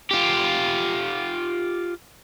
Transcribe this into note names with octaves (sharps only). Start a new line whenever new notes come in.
F4 G4